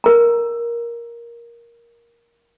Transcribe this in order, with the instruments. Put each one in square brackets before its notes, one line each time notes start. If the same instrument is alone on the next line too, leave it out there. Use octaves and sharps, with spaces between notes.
[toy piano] A#4 A#5